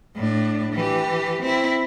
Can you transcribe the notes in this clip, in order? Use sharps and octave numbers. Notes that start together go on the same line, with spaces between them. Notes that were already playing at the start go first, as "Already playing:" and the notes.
A2 D4
E3 G4
C4 E4